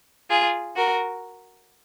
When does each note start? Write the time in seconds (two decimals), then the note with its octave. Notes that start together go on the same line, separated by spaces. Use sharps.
0.30 F4 G#4
0.76 F#4 A#4